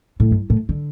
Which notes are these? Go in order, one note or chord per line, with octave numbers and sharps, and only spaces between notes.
A2
G2
A2
D3